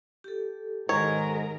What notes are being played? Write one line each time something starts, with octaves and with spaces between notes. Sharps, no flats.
G4 A4
G#2 D#3 A#4 C#5 A#5